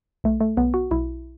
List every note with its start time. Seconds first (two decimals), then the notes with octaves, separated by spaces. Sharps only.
0.24 B1 A3
0.41 A3
0.57 B1 B3
0.74 F#4
0.91 B1 E4